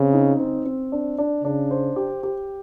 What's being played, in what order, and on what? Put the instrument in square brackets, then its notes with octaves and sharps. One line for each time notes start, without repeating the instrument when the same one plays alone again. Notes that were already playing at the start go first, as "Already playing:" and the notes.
Already playing: [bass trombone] C#3 [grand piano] C4
[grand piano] D#4
C4
C4
D4
D4
[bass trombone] C#3 [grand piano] D4
[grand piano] C5
G4
G4